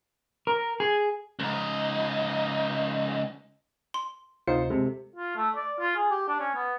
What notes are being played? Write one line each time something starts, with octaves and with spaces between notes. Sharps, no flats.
A#4
G#4
C#2 D#4
C6
D2 C3 D#4 F4 C5 C#7
C3 G#3 A4
F4
A3
D5
F4
G#4
G4
D4
C#4
B3